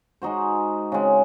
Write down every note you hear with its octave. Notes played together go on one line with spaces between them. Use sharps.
G#3 D#4 F#4 C5
C#3 G#3 C4